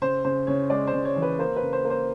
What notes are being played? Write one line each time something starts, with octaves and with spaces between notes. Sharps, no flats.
C#3 C5
C#3 C5
C#3 C#5
G#3 D5
C5
C#3
C#5
E3
B4
A#3 C5
B4
C#3
C5
A#3
C5